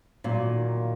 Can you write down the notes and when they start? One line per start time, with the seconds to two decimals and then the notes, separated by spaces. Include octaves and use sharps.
0.24 A#2 F#3
0.44 D#3
0.64 A#3